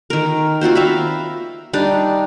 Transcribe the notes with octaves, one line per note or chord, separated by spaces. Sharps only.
D#3 A#4
C4 F4 F#4 C5
E5 F5 A#5 B5
G3 D4 D#4